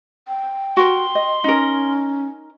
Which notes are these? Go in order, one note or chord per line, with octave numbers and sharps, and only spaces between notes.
G5
F#4 A#4 C6
D#5
C#4 D#4 A#4